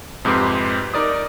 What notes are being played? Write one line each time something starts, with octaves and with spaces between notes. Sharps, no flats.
F2 G#2 C3 G4 B4 C6
D#4 A#4 D5 D#6